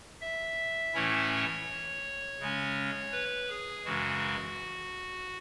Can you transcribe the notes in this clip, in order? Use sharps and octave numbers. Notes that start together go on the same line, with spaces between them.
E5
A2 E3 A3 C#4 E4 C#5
C#3 G#3 C#4
B4
G#4
F#2 C#3 E3 G#3 F#4